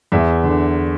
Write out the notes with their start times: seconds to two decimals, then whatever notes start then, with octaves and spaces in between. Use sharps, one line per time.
0.12 E2 E5
0.43 D3